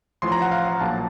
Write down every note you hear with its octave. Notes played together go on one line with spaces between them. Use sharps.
A1 A2 F3 C6
A#5
F#5
F5
F#5
A#1 A#2 F#3 A#3 A5